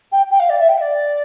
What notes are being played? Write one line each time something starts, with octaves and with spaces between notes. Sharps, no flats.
G5
G5
F5
D5
E5
G5
E5
D5